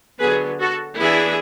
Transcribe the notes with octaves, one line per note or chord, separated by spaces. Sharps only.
D3 F#3 B3 G#4 B4
F#4 A4
E3 B3 D4 E4 G#4